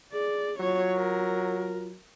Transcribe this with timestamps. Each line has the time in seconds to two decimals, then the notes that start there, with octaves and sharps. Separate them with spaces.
0.12 G#4 D5
0.60 F#3 F4 C#5
0.96 A#4